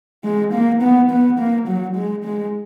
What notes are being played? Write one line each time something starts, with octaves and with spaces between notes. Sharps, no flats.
G#3
A#3
B3
B3
A#3
F#3
G#3
G#3